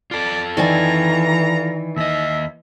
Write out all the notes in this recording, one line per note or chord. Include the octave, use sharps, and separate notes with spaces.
F4 A4 D5
D#3 E3 D5 G#5 A#5
D#2 D#5 E5